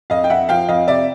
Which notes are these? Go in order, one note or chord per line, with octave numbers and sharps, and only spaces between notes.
F2 D#5 F5
G5
F2 E5 F#5
F3 F5 G5
F2 D#5 F5
C3 D5 E5